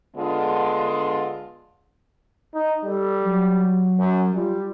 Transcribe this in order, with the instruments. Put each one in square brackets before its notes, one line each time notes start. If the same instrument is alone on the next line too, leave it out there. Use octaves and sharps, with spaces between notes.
[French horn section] D3 G#3 B3 D4 F4
[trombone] D#4
[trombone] G3 [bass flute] A4
[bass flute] F#3
[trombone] F#2
[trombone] G3 [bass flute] F4